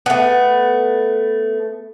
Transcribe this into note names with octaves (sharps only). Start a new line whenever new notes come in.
A3 B3